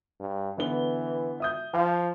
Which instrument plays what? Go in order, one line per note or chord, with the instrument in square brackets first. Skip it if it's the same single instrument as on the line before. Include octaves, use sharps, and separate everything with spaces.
[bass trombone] G2
[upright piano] D3 B3 G7 [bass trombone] E3
[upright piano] E5 D#6 G6
[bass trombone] F3 [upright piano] F5